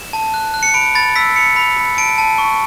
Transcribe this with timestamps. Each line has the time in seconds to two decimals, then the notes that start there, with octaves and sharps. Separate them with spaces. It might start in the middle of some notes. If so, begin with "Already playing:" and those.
Already playing: E7
0.13 A5
0.34 F#6
0.54 F#6
0.63 C#7
0.74 B5 D7
0.95 B5 A6
1.16 E6 B6
1.36 B5 C#7
1.56 B5
1.77 B5
1.98 A5 D7
2.18 A5
2.38 C#6